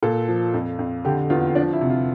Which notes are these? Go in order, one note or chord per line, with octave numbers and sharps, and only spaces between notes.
A#2 A4
F3
F2
F2
D3 G4
E2 F4
F3 D4
E4
C3
F4